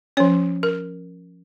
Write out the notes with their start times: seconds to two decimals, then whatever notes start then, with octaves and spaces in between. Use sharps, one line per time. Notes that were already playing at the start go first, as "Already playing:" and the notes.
0.17 F3 C#4 C#5
0.63 A#4